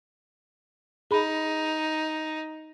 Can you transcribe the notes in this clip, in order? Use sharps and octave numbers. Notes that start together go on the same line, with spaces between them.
D#4 G#4 B5